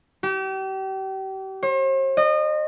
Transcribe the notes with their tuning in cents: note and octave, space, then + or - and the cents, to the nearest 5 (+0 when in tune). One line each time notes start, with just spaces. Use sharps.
G4 -35
C5 +45
D#5 -30